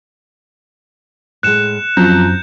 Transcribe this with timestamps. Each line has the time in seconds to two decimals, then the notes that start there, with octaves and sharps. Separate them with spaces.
1.43 A2 G#3 F#6 C#7 E7
1.97 F#2 F3 C4 A#5 G6